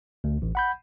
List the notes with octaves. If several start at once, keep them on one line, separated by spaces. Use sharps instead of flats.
D2
A1
F#5 B5 G6